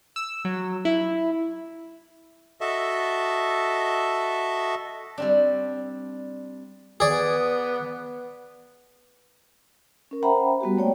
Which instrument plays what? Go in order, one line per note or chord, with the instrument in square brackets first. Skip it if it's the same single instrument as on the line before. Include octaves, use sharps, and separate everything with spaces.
[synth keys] E6
F#3
E4
[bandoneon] F#4 A4 D#5 E5 A5
[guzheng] G3 C4 D4
[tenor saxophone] B3 [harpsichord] G#4 D5
[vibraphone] C#4 A#4
C5 E5 F#5 G5 A#5 B5
G3 B3 F#4 G4
A3 A#3 C#5 D5 G5